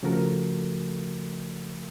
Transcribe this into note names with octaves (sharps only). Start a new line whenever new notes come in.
C#3 F3 A3 F#4 A4 A#4